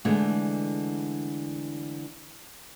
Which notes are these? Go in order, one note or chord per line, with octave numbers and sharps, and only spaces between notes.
D3 E3 G#3 A3